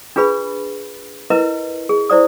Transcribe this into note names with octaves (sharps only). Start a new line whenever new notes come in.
D4 F4 G#4 B4 B5
E4 A#4 B4 D#5
G#4
E4 C5 D5 D#6